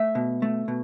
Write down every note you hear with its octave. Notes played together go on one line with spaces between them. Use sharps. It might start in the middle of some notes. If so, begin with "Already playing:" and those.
Already playing: A3 E5
B2
A3
B2